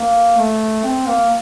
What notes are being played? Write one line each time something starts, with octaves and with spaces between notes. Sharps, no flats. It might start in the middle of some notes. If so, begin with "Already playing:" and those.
Already playing: A#3
A3
C4
A#3